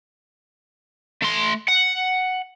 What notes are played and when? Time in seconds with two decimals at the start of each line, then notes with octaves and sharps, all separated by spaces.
1.22 A3 C6
1.68 F#5